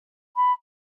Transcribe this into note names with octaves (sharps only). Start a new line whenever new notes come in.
B5